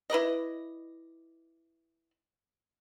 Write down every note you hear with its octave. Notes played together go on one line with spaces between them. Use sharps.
E4 B4 D5 D#5